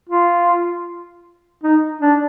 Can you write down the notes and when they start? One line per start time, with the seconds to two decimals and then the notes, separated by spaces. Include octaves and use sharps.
0.09 F4
1.63 D#4
2.01 D4